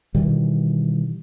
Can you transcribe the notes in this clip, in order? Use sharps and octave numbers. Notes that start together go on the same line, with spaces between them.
B2 D#3 E3 G3